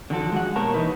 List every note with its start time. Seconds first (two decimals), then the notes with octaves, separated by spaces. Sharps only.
0.10 D3 D#3 F3 F#4 A4
0.32 G#3 F#4 F#5
0.56 B2 A#3 G4 A#4 C#5 A5
0.74 E3 D#4 B4